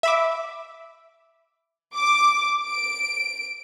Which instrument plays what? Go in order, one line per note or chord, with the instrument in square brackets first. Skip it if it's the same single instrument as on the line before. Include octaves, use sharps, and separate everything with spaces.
[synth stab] E5 B5 D6
[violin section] D6
D7